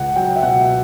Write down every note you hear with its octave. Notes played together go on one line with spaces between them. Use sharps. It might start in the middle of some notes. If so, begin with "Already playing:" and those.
Already playing: C#2 F#5
F#3 G5
E5
B2 F#5